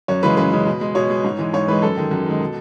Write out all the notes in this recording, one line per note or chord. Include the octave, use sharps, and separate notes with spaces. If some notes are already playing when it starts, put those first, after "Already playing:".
F#2 C#5
C#3 E3 G#3 B4
F#2 B4
C#3 E3 G#3
B2
G#3
B2 C#5
G#3
G#2
E3 G#3
G#2 C#5
E3 G#3 B4
F#2 A4
D#3 G#3
F#2
D#3 G#3
B2